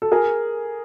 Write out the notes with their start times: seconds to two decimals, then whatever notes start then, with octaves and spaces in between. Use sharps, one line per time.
0.02 A4
0.12 G#4 A#4